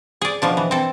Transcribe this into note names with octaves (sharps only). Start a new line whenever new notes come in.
G#4 D5
B2 F3 D4
E3
C4 A4